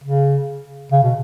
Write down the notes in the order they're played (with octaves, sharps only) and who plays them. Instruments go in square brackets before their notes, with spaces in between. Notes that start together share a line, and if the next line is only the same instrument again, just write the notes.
[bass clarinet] C#3
C#3
B2